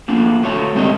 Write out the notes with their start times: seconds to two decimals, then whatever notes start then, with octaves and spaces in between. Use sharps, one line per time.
0.08 A3 A#3 D4 F4
0.43 A3 F#4 C#5 A5
0.75 G#3 C4 D4 G4 A#4 D#5